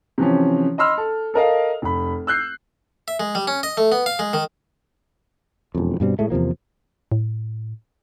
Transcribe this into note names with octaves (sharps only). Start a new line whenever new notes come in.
C3 E3 F3 C#4
D#5 B5 C6 E6 F6
A4
A4 A#4 D#5 F5
F1 B5
E6 F#6 G6 C7
E5
G#3
G3
C#4
D#5
A3
B3
F5
G#3
D#3
E1 F2
G2 B2 G3 C4
A2 G#3 A3
E2 C3 F3 A#3
A2